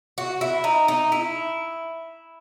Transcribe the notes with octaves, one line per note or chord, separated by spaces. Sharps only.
F#4
E4
D#4
D#4
E4